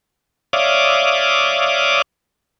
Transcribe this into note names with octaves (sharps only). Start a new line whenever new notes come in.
C#5 D5 E5 F5 D6 D#6